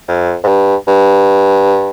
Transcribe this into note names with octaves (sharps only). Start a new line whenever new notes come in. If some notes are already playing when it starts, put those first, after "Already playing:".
F2
G#2
G2
G2